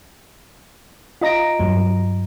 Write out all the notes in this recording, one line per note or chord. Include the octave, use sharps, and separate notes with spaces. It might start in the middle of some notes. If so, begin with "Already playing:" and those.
F4 D#5 A#5 A#6 D7
G2 F#3